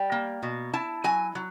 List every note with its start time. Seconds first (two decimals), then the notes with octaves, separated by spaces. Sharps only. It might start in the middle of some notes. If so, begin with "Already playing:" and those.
Already playing: G3 G5
0.12 A#3
0.43 B2
0.74 E4 A5
1.04 F#3 G#5
1.35 F#3